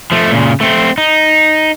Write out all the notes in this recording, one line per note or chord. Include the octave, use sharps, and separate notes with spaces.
F3 A3
A#2 C#3
A3 C4
D#4